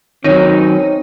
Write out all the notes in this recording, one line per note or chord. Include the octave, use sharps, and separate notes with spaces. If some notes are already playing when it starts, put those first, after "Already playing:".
D#3 F#3 C4 C#4 D#4